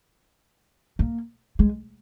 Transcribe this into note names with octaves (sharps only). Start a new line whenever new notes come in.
A#3
G#3